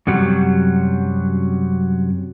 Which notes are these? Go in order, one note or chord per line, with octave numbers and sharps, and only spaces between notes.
F#2 C3 F#3 G3